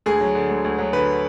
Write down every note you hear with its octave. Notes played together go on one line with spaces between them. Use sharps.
D2 G#4
F#3
D3
D2
D2
F#3
D3 B4